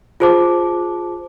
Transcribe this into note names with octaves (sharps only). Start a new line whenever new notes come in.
F4 G#4 C5 A5 D6